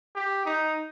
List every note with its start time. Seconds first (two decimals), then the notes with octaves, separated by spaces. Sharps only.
0.15 G4
0.45 D#4